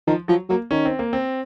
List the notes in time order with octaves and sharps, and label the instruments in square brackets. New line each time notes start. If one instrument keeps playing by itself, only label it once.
[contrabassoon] D#3 [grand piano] F3
[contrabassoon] F3 [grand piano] F#3
[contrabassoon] F#3 [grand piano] A#3
[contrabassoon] D#3 [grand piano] C#4
[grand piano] C4
A#3
C4